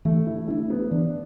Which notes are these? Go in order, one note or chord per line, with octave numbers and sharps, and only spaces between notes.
E3 A3
E4
A3 D4 E4
B3
E3 D4